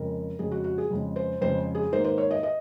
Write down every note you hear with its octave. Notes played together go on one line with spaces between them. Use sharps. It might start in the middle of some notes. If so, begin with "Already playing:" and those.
Already playing: F2 C#3 G#3 A#4
F2 C#3 G#3 G#4
F#4
F#4
G#4
F2 C#3 G#3
C5
F2 C#3 G#3 C5
G#4
G#2 D#3 A#3 C5
C5
C#5
D#5
D#5